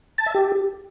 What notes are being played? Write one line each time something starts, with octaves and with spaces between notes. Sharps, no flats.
A5
E5
G4